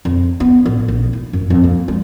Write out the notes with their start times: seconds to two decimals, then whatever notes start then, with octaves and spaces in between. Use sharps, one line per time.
0.05 F2
0.40 B3
0.66 A1
0.88 A#1
1.13 E4
1.33 F#2
1.50 F2
1.64 A#3
1.88 G#3